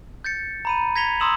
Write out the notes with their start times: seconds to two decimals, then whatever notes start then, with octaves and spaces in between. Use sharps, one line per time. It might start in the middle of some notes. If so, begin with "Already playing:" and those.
0.24 G6 A6 C#7
0.65 A#5 B5 D#7
0.96 G#6 A#6 B6 C#7 F7 G7
1.20 A#5 C6 D#6 E6 E7 F#7